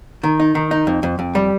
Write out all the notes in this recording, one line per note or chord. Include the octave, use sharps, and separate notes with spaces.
D#3
D#4
D#3
D#4
F2
F2
F2
G3